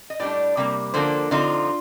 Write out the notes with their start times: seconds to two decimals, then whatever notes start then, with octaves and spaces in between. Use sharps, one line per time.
0.10 D#5
0.20 A2 G3 D4 D5
0.57 C3 G3 A#3
0.94 D3 F3 A#3 D4 C5
1.31 D3 F3 C4 D#4 F4